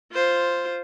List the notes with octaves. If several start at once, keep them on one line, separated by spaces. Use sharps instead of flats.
F4 C5